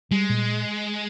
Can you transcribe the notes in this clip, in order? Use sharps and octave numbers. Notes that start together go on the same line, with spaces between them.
G3 G#3
A#2